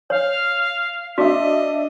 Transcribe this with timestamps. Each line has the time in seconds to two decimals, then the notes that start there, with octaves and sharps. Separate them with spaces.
0.10 C#5 F5
1.18 D4 F#4 D#5 E5